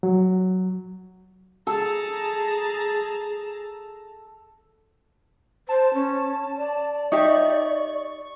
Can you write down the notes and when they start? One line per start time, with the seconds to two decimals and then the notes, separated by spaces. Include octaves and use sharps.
0.03 F#3
1.67 G#4 A4 A5 A#5
5.69 C5 A5
5.94 C#4
6.57 D5
7.12 D#4 G4 E5 C#6